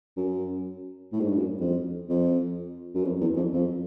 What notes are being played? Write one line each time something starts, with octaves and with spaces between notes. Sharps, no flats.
F#2
A2
G#2
G2
F#2
F2
F2
F#2
F2
E2
F2
F2